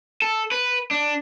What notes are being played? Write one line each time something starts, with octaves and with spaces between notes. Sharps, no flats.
A4
B4
D4